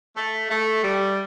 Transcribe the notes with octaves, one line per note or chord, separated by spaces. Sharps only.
A3
A3
G3